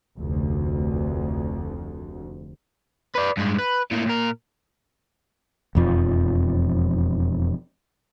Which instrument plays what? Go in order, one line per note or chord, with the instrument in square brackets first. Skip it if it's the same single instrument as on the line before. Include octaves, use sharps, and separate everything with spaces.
[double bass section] F1 D2
[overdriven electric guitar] B4 D5
G2 G#3
B4
A2 A#3
A#2 A#4
[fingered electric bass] E1 F2 F3